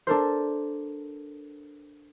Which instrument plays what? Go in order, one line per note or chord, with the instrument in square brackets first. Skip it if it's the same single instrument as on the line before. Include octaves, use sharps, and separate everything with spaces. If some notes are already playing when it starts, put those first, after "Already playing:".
[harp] D4 A4 A#4 C5